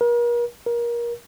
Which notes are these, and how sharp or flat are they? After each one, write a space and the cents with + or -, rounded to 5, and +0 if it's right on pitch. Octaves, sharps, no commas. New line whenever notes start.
A#4 +40
A#4 +25